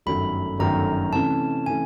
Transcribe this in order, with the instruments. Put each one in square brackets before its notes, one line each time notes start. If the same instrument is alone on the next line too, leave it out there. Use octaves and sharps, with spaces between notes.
[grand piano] G1 F#2 D#3 F#3 A3 [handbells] B5
[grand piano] G1 F#2 D#3 F#3 A3 [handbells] A#5
[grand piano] C3 E3 A3 C#4 [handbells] A5
[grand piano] C3 E3 A3 C#4 [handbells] G#5